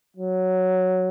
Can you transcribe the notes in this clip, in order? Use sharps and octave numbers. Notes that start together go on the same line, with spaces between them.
F#3